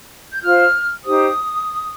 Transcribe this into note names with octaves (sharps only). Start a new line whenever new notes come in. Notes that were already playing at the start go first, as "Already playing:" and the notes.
G6
F4 C5 F6
D#4 G4 C5 D#6